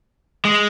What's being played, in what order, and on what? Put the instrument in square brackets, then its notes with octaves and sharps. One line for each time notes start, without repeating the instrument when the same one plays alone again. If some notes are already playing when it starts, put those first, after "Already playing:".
[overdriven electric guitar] G#3